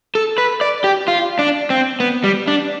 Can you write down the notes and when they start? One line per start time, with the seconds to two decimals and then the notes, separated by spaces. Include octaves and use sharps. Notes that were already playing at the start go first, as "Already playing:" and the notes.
0.15 A4
0.38 B4
0.61 D5
0.84 G4
1.08 F4
1.39 D4
1.70 C4
2.00 B3
2.24 G3
2.48 D4